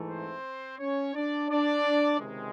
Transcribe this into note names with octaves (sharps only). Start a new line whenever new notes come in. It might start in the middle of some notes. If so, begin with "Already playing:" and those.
Already playing: G#2 E3 A3
C4 C5
C#4 C#5
D4 D5
D4 D5
C#2 C3 D#3 G#3